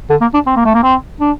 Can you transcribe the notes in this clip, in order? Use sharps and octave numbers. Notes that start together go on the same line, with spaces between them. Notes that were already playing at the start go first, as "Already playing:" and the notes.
D3
A#3
D4
C4
A#3
A3
A#3
C4
D4